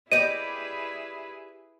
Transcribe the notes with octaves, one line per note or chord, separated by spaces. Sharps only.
E4 G4 G#4 B4 D5 D#5 D#7